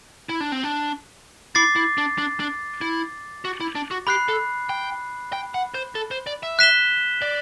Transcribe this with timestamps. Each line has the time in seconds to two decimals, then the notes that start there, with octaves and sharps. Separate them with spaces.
0.29 E4
0.40 D4
0.52 C4
0.64 D4
1.55 E4 D6 A6 C7
1.76 E4
1.98 D4
2.18 D4
2.40 D4
2.81 E4
3.45 F#4
3.60 E4
3.75 D4
3.91 F#4
4.07 G4 B5 F#6 C7
4.29 A4
4.69 G5
5.33 G5
5.54 F#5
5.74 C5
5.95 A4
6.11 C5
6.27 D5
6.43 E5
6.59 F#6 B6 E7 G7
7.22 D5